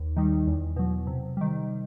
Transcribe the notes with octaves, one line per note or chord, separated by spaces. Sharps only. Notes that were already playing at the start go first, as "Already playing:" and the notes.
Already playing: D#2
D#3 G3 D#4
E2
B2 F#3
C3
D#3 G3